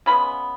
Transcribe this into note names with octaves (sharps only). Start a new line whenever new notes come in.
C#3 G#3 B3 B5